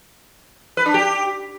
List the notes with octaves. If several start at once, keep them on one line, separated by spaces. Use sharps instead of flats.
B4
D4
G4